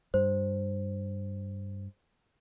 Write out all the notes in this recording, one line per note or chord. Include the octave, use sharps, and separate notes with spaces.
G2 C5